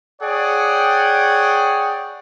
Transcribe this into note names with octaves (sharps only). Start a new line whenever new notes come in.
G#4 C#5 D5 F#5 G5